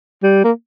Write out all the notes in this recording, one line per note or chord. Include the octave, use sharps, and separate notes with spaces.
G3
A#3